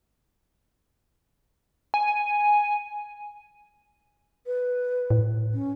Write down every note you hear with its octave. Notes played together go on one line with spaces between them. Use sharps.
G#5
B4
A2
C#4